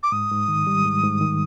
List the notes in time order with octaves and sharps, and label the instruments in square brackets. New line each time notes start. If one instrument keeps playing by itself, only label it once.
[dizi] D6
[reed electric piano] G#2 [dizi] D#6
[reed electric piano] G#2
D#3
G3
G#2
G#2
D#3